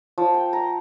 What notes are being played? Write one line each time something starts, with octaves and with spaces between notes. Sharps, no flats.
F3
G5
A#5